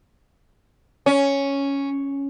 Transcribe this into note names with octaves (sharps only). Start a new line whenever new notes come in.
C#4